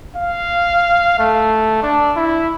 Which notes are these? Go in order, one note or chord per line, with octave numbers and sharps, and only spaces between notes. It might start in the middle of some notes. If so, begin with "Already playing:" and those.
F5
A3
D4
E4